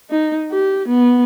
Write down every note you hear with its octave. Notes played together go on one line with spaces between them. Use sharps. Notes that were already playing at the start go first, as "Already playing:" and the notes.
D#4
G4
B3